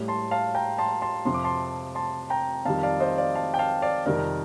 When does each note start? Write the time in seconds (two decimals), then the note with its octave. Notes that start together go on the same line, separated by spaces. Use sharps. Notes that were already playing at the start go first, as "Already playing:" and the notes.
Already playing: A2 G3
0.08 A5 C6
0.31 F5 A5
0.55 G5 A#5
0.78 A5 C6
1.02 A5 C6
1.25 F2 C3 F3 C6
1.34 D6
1.44 A5 C6
1.95 A5 C6
2.30 G5 A#5
2.65 F2 D#3 G3 F5 A5
2.83 D5 F5
3.00 C5 D#5
3.18 D5 F5
3.35 F5 A5
3.54 G5
3.59 F5 A5
3.82 D5 F5
4.05 F2 C3 D#3 G3 A#4 D5